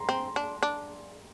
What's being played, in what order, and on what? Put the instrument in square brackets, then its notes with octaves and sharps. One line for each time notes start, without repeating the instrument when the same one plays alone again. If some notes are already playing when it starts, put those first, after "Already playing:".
Already playing: [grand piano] A#5 C6
[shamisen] C4
D4
D4